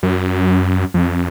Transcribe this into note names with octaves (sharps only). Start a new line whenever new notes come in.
F#2
F2